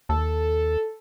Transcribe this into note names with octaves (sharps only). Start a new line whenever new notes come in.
D#2 A4